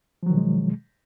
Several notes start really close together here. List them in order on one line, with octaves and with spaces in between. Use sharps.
F3 F#3 D#3 B2 G#3